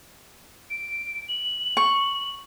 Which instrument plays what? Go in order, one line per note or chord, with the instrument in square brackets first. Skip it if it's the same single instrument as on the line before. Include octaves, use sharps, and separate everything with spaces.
[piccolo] D7
F#7
[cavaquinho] C#6